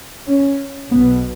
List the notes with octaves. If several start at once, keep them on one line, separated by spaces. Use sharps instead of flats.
C#4
B1 B2 B3